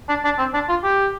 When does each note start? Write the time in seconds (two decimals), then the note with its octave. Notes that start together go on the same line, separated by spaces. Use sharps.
0.09 D4
0.24 D4
0.38 C4
0.54 D4
0.69 F4
0.84 G4